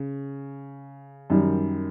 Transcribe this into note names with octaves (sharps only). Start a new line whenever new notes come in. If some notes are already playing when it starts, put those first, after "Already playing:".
Already playing: C#3
F#2 D#3 G3